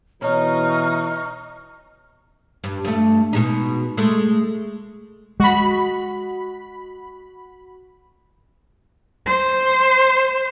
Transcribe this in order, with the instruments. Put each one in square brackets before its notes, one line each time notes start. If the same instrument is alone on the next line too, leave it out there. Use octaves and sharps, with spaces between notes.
[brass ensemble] B2 E3 [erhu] D#4 [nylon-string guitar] C#5 [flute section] C#6 F6
[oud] G2
G2 A3
B2 G#3 D#4
G#3 A3
[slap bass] G#3 [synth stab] F#4 B5
[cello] C5